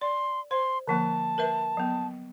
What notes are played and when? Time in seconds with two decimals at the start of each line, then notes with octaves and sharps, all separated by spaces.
0.01 D5 C6
0.51 C5 C6
0.87 D3 F3 A#3 A5
1.38 A#4 B4 E5
1.77 F#3 B3